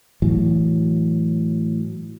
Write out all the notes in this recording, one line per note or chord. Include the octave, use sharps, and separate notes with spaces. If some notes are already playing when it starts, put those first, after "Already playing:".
A2 E3 F#3